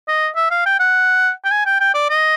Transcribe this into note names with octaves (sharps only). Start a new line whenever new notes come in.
D#5
E5
F5
G5
F#5
G5
G#5
G5
G5
D5
D#5